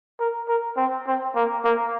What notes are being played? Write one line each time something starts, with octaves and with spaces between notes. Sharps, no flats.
A#4
A#4
C4
C4
A#3
A#3